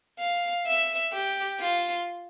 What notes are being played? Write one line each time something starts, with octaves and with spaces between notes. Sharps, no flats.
F5
E5
G4
F4